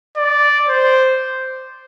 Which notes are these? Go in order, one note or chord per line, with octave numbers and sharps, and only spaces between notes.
D5
C5